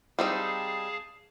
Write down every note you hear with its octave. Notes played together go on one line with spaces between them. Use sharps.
G3 C4 D#4 G#4 F5 A5